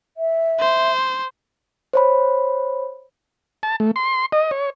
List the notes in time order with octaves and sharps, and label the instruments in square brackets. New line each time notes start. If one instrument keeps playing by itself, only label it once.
[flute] E5
[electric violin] C5
[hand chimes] C5 C#5 B5
[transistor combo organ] A5
A3
C6
D#5
C#5